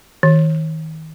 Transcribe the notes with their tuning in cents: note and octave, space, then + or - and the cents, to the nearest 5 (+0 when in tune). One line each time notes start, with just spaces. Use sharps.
D#3 +35